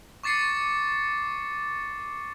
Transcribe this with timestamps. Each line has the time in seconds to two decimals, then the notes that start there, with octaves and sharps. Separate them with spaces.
0.23 C#6 D6 A6 C7 C#7